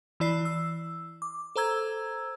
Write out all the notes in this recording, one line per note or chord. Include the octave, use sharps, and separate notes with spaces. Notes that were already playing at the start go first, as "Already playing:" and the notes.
E3 E4 D5 B5 C7
E6
D6
A4 C5 A#5 E6 G#6